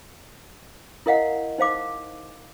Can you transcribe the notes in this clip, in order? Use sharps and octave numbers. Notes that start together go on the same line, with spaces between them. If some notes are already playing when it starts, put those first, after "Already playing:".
E4 A#4 D#5 F5 F#5
D#4 C5 F5 D6